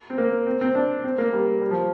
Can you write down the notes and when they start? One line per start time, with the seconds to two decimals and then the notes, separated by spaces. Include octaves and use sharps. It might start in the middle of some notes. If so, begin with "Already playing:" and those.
0.10 C4
0.18 A#3
0.47 C4
0.61 C4
0.75 D4
1.04 C4
1.18 A#3
1.33 G3
1.61 G3
1.71 F3